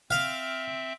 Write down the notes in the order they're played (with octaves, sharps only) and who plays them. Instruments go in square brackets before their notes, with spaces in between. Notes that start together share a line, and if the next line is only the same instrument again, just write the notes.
[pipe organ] C4 E5 [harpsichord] F5